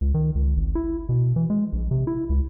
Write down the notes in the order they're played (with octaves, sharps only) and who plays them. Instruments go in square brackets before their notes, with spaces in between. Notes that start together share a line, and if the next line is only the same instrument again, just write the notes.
[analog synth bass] C#2
D#3
C#2
G#1
E4
B2
E3
G#3
A#1
C3
E4
C#2